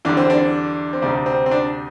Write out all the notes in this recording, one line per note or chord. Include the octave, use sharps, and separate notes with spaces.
E2 D3 G3 D4
C4
D4
C4
D2 C3 G3 D4
C4
C4
D4